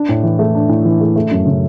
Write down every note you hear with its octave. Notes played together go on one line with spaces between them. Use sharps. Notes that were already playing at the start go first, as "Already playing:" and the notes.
Already playing: D4
A2
E3
A3
D4
A2
E3
A3
A3
F#2
C#3